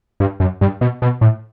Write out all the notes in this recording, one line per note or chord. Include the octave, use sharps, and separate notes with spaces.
G2
F#2
G2
B2
B2
A2